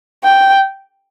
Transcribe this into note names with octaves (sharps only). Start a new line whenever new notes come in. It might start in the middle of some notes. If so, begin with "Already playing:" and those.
G5